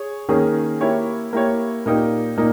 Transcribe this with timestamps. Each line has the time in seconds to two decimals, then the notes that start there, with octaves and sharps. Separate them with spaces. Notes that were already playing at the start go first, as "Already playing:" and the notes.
Already playing: G#4 C#5
0.29 D#3 A#3 C#4 G#4 C#5
0.81 A#3 E4 G4 C#5
1.33 A#3 E4 G4 C#5
1.86 A#2 A#3 D#4 G4 A#4
2.37 A#2 A#3 D#4